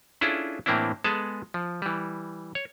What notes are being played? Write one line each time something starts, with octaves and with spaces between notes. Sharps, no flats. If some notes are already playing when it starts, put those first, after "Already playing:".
C#4 D4 E4 F4 G#4 A4
A2 E3 A#3 C4 D4 E4
G#3 B3 G#4 A4 A5
F3
E3 G3
C#5